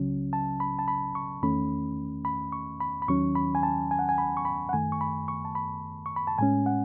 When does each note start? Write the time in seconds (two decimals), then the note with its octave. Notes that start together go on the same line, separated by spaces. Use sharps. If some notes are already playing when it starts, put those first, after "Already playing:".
Already playing: C#2 C#3 F#3 C#4
0.33 A5
0.60 B5
0.79 A5
0.88 B5
1.15 C#6
1.42 E2 D#3 A3 C#4 B5
2.25 B5
2.52 C#6
2.80 B5
3.02 B5
3.08 D#2 D#3 F#3 C#4 C#6
3.35 B5
3.55 G#5
3.63 A5
3.91 G#5
3.99 F#5
4.09 G#5
4.18 B5
4.37 C#6
4.45 B5
4.69 F#5
4.73 F#2 D#3 A3 G#5
4.92 C#6
5.01 B5
5.28 C#6
5.45 A5
5.55 B5
6.06 C#6
6.16 B5
6.27 A5
6.38 A2 G#3 C#4 G#5
6.66 F#5